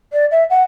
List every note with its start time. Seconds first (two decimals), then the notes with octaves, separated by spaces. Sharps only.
0.12 D5
0.31 E5
0.50 F#5